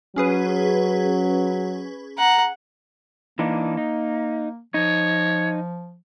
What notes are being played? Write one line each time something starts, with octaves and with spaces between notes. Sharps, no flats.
F#3 C#4 G#4 B4
F#5 A#5
E3 A#3 D4 D#4
D#4
F3 D#4 C#5